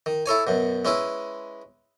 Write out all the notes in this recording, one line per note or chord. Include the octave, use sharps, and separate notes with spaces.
D#3
E4 A4 C#5 G#5
F#2 B2
G#3 C#4 E4 B4